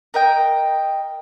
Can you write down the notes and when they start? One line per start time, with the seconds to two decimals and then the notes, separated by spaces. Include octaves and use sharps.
0.14 A#4 D#5 G5